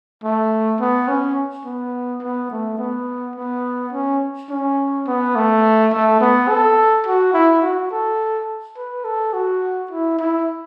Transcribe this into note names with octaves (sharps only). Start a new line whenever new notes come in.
A3
B3
C#4
B3
B3
A3
B3
B3
C#4
C#4
B3
A3
A3
B3
A4
F#4
E4
F#4
A4
B4
A4
F#4
E4
E4